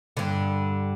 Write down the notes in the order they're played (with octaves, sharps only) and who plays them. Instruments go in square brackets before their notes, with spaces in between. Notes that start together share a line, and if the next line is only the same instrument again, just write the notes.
[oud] G2 D3